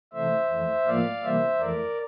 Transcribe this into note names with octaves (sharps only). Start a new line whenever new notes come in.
C3 E3 A3 C5 E5
F2 E3 A3
A2 F3 A#3 D5 F5
C3 E3 G3 A#3 C5 E5
F2 E3 A3 A#4 D5